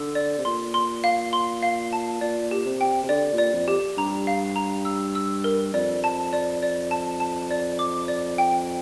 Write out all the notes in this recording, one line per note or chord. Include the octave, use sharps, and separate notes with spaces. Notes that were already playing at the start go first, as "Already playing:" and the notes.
Already playing: D3 E6
D5
C3
A#2 C6
C6
F5
C6
F5
A5
A#2 D5
G4
C3
G5
C3
D3 D5
A#2
D5
F2
G4
G2 A#5
F5
A#5
E6
E6
A#4
F2 D5
A5
D5
D5
A5
A5
D5
D6
D5
G5